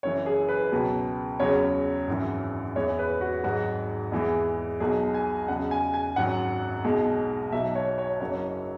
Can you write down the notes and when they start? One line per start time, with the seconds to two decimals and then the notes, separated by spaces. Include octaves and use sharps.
0.03 F#1 F#2 E3 C#5
0.26 G#4
0.49 B4
0.72 C#2 B2 F#3
1.40 E2 C#3 F#3 C#5
2.07 G#1 F#2 E3
2.76 E2 E3 G#3 C#5
2.99 B4
3.21 F#4
3.44 G#1 G#2 F#3 F#4
4.12 E2 E3 G#3
4.80 B1 B2 F#3 G#4
5.14 G#5
5.48 E2 C#3 F#3 F#5
5.71 G#5
5.94 G#5
6.16 G#1 F#2 F#3 F#5
6.84 B1 B2 G#3
7.52 B1 B2 F#3 E5
7.75 C#5
7.98 C#5
8.20 F#1 F#2 F#3 C#5